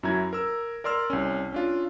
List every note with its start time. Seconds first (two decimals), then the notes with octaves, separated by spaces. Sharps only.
0.03 F#2 F#3 E4 A#5 G#6
0.33 A#4 E6
0.84 A#4 D5 C6 E6 F6
1.10 C2 C#4
1.52 C#4 D4 F4